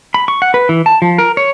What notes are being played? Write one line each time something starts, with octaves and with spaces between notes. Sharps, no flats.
B5
C#6
F#5
B4
E3
A5
F3
A#4
C#5